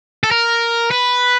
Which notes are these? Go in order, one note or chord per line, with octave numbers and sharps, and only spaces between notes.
A4
A#4
B4